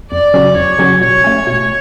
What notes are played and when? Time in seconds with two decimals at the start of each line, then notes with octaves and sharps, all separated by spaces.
0.11 F2 D5
0.34 C#3 F#3 C#4 F#4
0.56 F2 C#5
0.78 C#3 F#3 C#4 F#4
1.01 B2 C#5
1.24 A3 C#4
1.47 B2 C#5